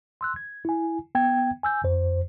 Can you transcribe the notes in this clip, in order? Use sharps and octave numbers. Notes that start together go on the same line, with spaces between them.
C6 E6 F#6
G#6
E4 G#5
B3 G5 G#6
G#5 E6 G6
F2 C5